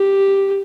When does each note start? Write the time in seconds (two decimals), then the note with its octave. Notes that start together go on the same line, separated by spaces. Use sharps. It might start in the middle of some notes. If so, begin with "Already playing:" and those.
Already playing: G4